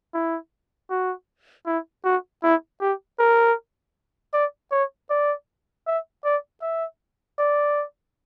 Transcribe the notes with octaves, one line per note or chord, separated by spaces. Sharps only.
E4
F#4
E4
F#4
E4
G4
A#4
D5
C#5
D5
E5
D5
E5
D5